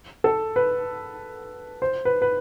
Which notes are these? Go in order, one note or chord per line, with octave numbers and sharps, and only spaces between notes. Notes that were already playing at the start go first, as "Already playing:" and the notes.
A4
B4
C5
B4
B4